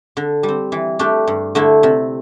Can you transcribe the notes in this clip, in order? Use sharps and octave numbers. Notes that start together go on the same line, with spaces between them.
D3
G3
C4
E3
A3 D4 G4
G2
D3 A3 E4
C3